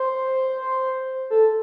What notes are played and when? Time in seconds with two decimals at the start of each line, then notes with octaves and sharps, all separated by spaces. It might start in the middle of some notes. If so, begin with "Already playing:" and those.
Already playing: C5
1.30 A4